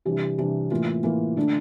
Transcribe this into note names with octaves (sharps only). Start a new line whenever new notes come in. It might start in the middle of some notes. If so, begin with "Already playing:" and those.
C3 E3 G3 D4
C3 E3 G3 D4
A2 E3 A#3 F4
A2 E3 A#3 F4
D3 A3 D4